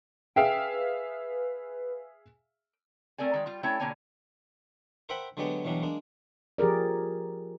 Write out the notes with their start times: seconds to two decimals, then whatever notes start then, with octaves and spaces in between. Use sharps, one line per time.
0.36 G#4 B4 E5 F5 G5
3.18 A3 C4 A#4 D5 G#5
3.34 D#3 G#3
3.46 G3 F4
3.63 A3 C#4 E4 A4 C#5 G5
3.80 B2 D3 A#3 D#4 C#5 G#5
5.09 A#4 C5 E5 F#5 G5 B5
5.37 D3 F#3 G#3 B3 G4 D5
5.65 B2 E3 F#3 G3 D4
5.83 G#3 A#3 D4
6.58 F3 G4 G#4 A#4 D5